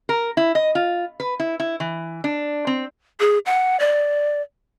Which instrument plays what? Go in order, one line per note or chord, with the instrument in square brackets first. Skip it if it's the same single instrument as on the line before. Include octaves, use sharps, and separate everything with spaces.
[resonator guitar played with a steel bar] A#4
E4
D#5
F4
B4
E4
E4
E3
D4
C4
[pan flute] G#4
F#5
D5